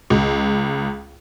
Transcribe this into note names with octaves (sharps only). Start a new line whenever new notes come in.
C#2